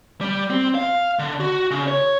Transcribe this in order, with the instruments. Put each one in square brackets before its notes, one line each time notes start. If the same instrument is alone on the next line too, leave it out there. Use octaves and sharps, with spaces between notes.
[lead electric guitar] G3
C4
F5
D3
F#4
C#3
C#5